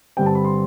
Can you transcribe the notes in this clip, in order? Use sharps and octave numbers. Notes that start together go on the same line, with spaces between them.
G2 D3 G3 C4 G5
A5
B5
C6